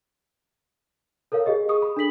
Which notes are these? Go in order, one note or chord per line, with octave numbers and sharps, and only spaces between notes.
A4 A#4 C#5 F5
G4 G#4 D#5
G#4 C#6 D#6
B5
D4 A4 B6 F#7